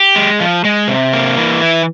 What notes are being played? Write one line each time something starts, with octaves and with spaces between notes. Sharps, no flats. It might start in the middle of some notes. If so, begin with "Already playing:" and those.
Already playing: G4
G#3
F3
G#3
C3
A#3
E3
E4